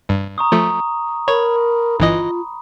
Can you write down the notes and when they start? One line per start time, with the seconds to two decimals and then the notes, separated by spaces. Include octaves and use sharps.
0.09 G2
0.38 A#5 C#6 D#6
0.52 F3 A3
1.28 A#4 C#5 B5
2.00 G1 E3 F4 D#5